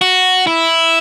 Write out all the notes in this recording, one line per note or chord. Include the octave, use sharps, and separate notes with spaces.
F#4
E4